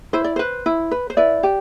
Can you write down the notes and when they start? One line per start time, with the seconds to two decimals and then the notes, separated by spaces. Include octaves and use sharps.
0.13 E4 C5
0.24 D5
0.36 B4 C5
0.66 E4
0.91 B4
1.10 C5
1.17 E4 B4 D5
1.43 G4